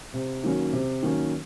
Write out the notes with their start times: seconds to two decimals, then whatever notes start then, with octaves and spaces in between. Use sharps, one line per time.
0.14 C3
0.43 D#3 F#3 A#3 C#4
0.73 C3
1.02 D#3 F#3 A#3 C#4